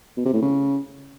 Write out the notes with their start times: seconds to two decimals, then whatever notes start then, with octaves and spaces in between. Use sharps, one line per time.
0.17 B2
0.25 C3
0.34 A2
0.42 C#3